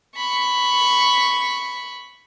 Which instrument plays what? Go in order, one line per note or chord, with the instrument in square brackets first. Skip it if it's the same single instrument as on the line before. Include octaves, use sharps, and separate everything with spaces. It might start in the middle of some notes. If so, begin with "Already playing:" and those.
[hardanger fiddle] B5 C#6